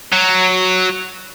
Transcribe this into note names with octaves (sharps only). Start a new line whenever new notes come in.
F#3